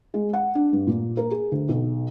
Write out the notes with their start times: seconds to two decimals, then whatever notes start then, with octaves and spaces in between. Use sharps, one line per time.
0.14 G#3
0.33 F#5
0.55 D4
0.73 G2
0.87 A#2
1.17 A#4
1.31 G#4
1.52 D2
1.69 B1